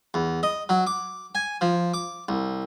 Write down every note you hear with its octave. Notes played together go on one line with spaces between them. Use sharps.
E2
D#5
F#3
D6
G#5
F3
D6
C2